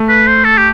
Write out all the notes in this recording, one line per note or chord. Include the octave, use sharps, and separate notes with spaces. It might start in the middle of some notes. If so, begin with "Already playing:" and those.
Already playing: A3
B4
C5
A4
G4